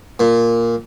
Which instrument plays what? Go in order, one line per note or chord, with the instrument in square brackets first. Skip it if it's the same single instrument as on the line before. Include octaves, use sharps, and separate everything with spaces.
[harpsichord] A#2